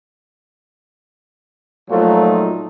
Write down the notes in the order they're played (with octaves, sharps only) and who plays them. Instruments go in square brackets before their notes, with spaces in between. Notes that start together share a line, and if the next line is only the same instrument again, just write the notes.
[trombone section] A#2 F3 F#3 A3 D#4 F4